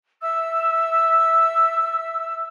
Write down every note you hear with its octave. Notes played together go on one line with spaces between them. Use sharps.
E5 E6